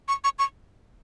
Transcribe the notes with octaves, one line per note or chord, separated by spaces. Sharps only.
C#6
C#6
C#6